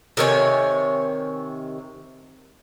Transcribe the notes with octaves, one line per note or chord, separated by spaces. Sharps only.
C3 D#3 C#5 G#5